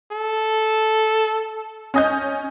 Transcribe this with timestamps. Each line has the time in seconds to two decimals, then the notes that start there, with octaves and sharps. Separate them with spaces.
0.12 A4
1.94 C#4 D#5 G6